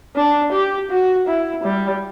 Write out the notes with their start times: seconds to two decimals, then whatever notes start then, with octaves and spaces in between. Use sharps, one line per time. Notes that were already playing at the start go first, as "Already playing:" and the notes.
0.16 D4
0.52 G4
0.90 F#4
1.27 E4
1.64 G3